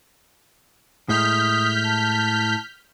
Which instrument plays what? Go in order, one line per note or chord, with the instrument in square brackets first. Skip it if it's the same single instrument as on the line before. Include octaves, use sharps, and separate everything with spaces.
[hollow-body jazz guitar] A2 G#3 [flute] D#6 [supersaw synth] F6 G6 B6
[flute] A5